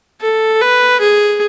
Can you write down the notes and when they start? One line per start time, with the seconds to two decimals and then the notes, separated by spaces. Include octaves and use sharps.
0.21 A4
0.61 B4
1.00 G#4